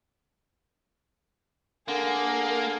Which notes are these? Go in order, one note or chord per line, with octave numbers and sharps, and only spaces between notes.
D3 A#3 G#4 A#4